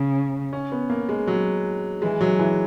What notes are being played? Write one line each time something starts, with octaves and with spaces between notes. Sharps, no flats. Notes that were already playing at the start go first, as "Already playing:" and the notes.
Already playing: C#3
C#4
B3
A#3
G#3
F#3
E3 G#3
F#3
E3